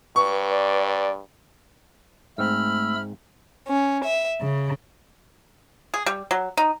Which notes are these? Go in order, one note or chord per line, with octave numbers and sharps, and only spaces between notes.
G2 B4 C#6
D5
D5
G#2 A3 C4 B5 E6 F6
C#4
E5
C#3
G#4
G3
F#3
D#4